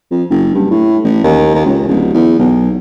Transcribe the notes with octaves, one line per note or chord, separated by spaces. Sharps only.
F2
F#1
G2
A2
A1
D#2
D#2
C#2
D1
E2
B1